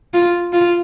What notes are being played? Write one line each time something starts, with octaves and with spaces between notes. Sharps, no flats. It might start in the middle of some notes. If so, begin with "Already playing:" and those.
F4
F4